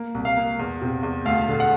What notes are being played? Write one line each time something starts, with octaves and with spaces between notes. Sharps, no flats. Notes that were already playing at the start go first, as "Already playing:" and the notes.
Already playing: A#3
C2
F5
A#3
E2
C3
E2
D2 F5
D3
F#5